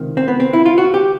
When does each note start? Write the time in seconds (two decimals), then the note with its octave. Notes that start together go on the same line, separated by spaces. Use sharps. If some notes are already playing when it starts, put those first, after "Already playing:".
Already playing: C#2 C3 D#3
0.17 C4
0.28 B3
0.40 C4
0.53 E4
0.66 F4
0.78 F#4
0.94 G4